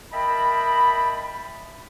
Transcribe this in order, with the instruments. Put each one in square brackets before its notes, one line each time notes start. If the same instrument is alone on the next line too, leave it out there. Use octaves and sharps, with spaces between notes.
[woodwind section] A#4 D#5 E5 G5 A5 B5